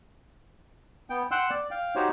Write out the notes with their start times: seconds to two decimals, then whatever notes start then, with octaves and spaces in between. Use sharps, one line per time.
1.10 B3 G5
1.31 F#5 G5 C6 E6 F#6
1.50 D5
1.71 F5 G5
1.96 D#4 F#4 G4 C5 C#5